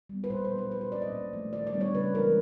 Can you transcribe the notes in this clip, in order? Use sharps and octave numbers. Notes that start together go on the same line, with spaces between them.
G3 B3
B4
A#2 C5
C5
F#3 B3 D4
B4
F3 B4
C5
A#3 C#4 D5
D#5
A#2
F3 A3
D#3 D5
D5
G3 B3 D4
C#5
C#3 B4
E3 G#3 C#4 A#4